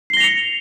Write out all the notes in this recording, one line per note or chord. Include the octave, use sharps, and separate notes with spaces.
A#6 C7 C#7 F7 G7